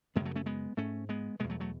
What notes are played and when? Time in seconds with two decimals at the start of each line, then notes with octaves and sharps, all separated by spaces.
0.16 F#2 C#3 G#3 B3
0.25 F#3 A3
0.36 A3 C#4
0.46 G#3 B3
0.77 G#2 A3 C#4
1.09 G#3 B3
1.39 E2 B2 G#3 B3
1.50 F#3 A3
1.60 F#3 A3